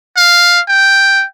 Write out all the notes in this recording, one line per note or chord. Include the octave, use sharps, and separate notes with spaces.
F5
G5